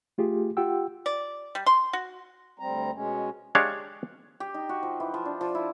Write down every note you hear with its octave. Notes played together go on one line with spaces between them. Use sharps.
A3 F4 G4 G#4
F4 G4 F#5 G5 E6
D5
G3
C6
F#4
D2 G3 C4 A#5
B2 G#3 C#4
G#3 D4 G4 C#5 F5
G4
D#4
F#4
F3
E3
F3
D4
F3
E4